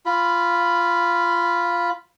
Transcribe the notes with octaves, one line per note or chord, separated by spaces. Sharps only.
F4 B5